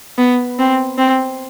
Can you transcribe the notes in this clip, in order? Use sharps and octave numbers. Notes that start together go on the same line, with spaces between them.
B3
C4
C4